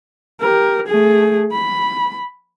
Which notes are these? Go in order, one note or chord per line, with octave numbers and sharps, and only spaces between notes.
G4 A#4
A3 G#4
B5